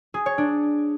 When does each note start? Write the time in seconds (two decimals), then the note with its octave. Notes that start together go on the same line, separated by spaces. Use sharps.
0.14 G#4
0.26 C#5
0.38 D4